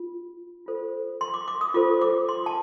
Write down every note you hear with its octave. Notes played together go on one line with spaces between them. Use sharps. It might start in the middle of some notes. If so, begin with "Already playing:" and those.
Already playing: F4
F4 A4 C5
C6
D6
D6
D#6
F4 A4 C5 D6
D6
C6
A5